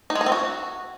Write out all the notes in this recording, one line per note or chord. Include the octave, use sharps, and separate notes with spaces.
D#4
G#3
D#4
C4
F#4